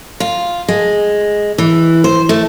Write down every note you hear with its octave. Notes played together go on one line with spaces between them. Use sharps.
F4
G#3
E3
C5
A3